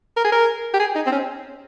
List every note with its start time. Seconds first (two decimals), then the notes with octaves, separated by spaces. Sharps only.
0.17 A#4
0.25 G#4
0.32 A#4
0.74 G4
0.80 G#4
0.95 D#4
1.06 C4
1.12 C#4